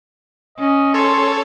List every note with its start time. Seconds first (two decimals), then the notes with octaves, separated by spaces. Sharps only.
0.58 C#4 D#5
0.94 A4 C#5 C6